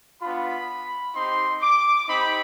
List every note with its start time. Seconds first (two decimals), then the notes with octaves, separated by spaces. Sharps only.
0.21 B3 D4 F4 B5
1.15 C4 D#4 G4 C6
1.61 D6
2.07 C4 D#4 G4 B5